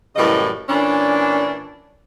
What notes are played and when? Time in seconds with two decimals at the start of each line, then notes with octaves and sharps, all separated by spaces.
0.16 F#2 A2 C#3 E3 G3 D#5
0.69 A#2 E3 C#4 D4